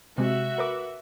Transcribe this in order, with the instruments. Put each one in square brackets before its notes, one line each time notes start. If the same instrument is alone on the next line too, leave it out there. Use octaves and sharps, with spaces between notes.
[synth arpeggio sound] C3 G#3 [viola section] F#4 E5
[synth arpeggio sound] A#4 B4 D6